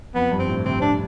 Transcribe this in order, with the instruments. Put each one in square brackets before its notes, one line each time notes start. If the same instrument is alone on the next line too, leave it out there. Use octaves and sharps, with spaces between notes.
[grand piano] F2 [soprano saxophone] B3
[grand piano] G2
[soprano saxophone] C4
[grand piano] A2
[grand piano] C3 [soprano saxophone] C4
[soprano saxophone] D4